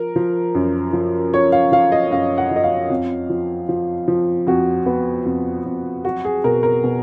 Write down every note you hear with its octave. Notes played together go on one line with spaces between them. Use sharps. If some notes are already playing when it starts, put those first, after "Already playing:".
Already playing: F3 A#4
F3
F#2
F3
F3 C#5
F5
F3 F5
D#5
F#2 F5
F#5
F3
D#5
F5
F2
F3
F3
F3
F2 F#4
B3
F2
F2
F#3 F#4
G#4
B2 A#4
A#4
B2